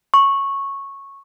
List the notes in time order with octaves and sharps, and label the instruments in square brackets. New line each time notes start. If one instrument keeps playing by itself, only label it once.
[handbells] C#6